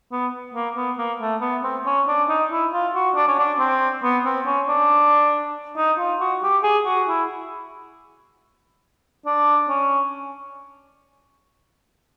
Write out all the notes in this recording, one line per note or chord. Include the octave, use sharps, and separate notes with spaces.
B3
A#3
B3
A#3
A3
B3
C4
C#4
D4
D#4
E4
F4
F#4
D4
C#4
D4
C4
B3
C4
C#4
D4
D#4
F4
F#4
G4
G#4
F#4
E4
D4
C#4